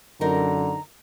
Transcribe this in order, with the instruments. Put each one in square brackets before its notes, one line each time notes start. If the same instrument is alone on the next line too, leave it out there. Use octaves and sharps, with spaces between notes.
[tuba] F#2 [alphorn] D3 [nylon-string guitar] D#4 A#4 [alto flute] A#5